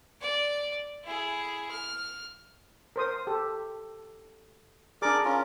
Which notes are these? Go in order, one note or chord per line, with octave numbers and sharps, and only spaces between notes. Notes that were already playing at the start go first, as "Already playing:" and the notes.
D5
E4 G#4
F6
A#4 C5 D#6
G4 A4
D4 G#4 A#4 D5 D6
C#4 F4 A#4